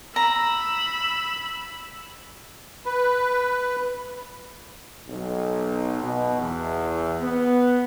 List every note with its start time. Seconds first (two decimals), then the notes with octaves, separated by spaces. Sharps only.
0.16 A#5 B5 E6
2.86 B4
5.08 B1
6.03 B2
6.38 E2
7.20 B3